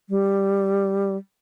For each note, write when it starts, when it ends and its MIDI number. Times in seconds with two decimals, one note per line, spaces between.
0.09 1.17 55